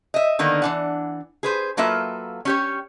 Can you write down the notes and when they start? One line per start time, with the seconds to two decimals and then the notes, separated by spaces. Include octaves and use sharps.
0.14 D#5 E5
0.39 D3 D#3 A#3 B3
0.62 E3 D4 F#5
1.43 G#4 B4 C5
1.77 F#3 A#3 F4 A4 B4 E5
2.45 C#4 G4 C#5